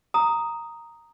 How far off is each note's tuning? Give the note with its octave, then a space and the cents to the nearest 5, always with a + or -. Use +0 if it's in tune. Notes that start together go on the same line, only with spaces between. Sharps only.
A#5 -5 D#6 +0